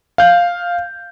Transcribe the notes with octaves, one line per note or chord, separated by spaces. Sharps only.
F5 G6